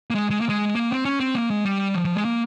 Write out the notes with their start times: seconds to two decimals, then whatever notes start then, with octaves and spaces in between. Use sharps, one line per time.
0.10 A#3
0.15 G#3
0.30 G#3
0.41 A#3
0.49 G#3
0.76 A#3
0.90 C4
1.05 C#4
1.20 C4
1.35 A#3
1.50 G#3
1.65 G3
1.95 F3
2.05 F3
2.15 G#3
2.25 A#3